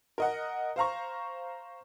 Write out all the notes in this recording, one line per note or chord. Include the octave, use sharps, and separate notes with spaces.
A#4 D#5 F#5
C5 F5 A#5 C#6